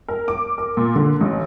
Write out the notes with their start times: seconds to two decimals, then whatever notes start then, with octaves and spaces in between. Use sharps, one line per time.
0.08 A#4
0.28 D6
0.58 A#4
0.77 A#2
0.96 D3
1.20 A1